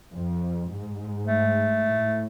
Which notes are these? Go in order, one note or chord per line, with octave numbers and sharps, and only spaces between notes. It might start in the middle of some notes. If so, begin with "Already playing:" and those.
F2
G#2
A3
A2